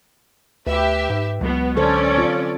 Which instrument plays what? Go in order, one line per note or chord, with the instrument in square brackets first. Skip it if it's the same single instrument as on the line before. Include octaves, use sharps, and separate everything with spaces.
[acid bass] D2 [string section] G4 E5 [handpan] B4
[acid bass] G#2
[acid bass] C#2 [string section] B2 B3 [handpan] F#3
[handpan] D3 A4 C5 [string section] C#4 D5
[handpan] C4 F4